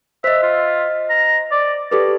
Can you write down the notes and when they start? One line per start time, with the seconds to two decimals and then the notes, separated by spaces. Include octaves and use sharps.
0.24 C5 D#5 E5
0.43 F4
1.10 A#5
1.51 D5
1.91 G4 A4 B4 D5